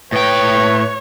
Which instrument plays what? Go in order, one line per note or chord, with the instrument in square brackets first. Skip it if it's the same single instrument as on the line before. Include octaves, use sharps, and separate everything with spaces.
[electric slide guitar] A2 G5 [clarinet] B4 [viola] C#5